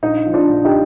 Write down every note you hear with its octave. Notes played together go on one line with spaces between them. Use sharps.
A#1 D#4
F3
D4 F4
A#1
D#4 G4